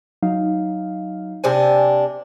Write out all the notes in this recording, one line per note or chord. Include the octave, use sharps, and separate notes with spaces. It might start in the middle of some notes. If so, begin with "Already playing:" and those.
F#3 D#4 F5
C3 D4 C5 G#5